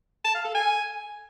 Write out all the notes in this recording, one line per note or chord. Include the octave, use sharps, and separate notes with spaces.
A5
F5
A4
G#5